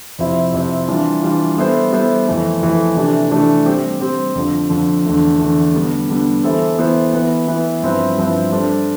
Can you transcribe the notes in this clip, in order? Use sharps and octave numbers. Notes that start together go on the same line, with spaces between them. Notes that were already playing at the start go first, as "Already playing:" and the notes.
F2 C3 F3 C4 E4
F2 C3 F3 C4 E4
E3 G3 D4 F4
E3 G3 D4 F4
G3 B3 E4 A4 C5
G3 B3 E4 A4 C5
F2 E3 A3
F2 E3 A3
C3 E3 A3 D4 G4
C3 E3 A3 D4 G4
G3 C4 G4 C5
G3 C4 G4 C5
F2 D3 F3
F2 D3 F3
E2 D3 A3
E2 D3 A3
D3 G3 B3
D3 G3 B3
E3 B3 E4 A4 C5
E3 B3 E4 A4 C5
E3 B3 E4 B4
E3 B3 E4 B4
G2 F3 C4 E4 B4
G2 F3 C4 E4 B4
G3 D4 A4 C5